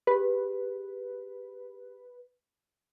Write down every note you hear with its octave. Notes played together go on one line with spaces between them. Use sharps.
G4 G#4 B4